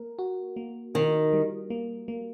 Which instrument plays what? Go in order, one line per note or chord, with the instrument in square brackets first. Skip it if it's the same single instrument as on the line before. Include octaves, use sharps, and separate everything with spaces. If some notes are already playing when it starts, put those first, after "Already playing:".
Already playing: [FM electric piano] A#3 A#4
F#4
A#3
[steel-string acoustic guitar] D#3 [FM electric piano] A#4
[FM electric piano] G3
A#3
A#3